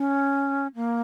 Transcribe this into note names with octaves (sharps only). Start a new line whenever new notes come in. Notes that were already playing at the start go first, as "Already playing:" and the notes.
Already playing: C#4
A#3